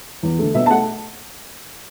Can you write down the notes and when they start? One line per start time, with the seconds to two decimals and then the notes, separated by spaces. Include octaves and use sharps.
0.23 E2
0.39 D3 A3
0.54 B2 E5
0.66 A5
0.71 A3 F#5